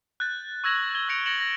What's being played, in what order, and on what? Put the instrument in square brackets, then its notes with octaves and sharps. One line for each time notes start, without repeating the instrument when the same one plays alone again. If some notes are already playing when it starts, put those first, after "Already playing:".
[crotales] F#6 G6 A6
C#6 E6 G#6 A#6 E7 F#7
G#6 G7
E6 G6 A#6 C#7 D7 F7
A6 A#6 C#7 D7 E7 F#7
A#6